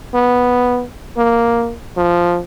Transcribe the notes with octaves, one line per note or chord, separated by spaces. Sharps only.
B3
A#3
F3